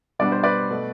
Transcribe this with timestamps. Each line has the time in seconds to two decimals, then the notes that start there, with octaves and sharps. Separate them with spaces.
0.19 B2 G3 B3 D4 D5
0.32 C5
0.43 B4 D5
0.70 B2 A3